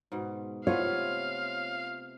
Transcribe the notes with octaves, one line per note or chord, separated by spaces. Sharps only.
G#2 B2
C3 A3 B3 F4 C#5 F5